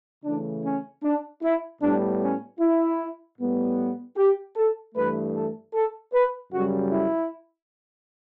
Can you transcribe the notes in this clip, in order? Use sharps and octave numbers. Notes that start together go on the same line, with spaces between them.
C#3 E3 A3 D4
C#4
D4
E4
A2 G3 B3 D4
C#4
E4
A2 G3 B3
G4
A4
G2 E3 A3 B4
A4
A4
B4
F#2 C#3 G3 F#4
E4